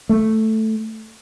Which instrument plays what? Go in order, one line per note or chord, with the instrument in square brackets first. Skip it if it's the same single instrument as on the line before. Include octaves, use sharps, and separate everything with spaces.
[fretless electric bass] A3